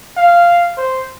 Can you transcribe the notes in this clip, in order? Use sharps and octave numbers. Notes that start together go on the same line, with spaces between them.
F5
C5